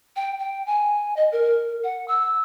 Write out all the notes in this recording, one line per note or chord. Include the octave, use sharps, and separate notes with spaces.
G5
G5
G#5
D#5
A#4
F#5
E6